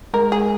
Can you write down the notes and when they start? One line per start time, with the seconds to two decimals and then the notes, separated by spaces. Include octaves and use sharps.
0.14 G#3 A#4
0.32 G#4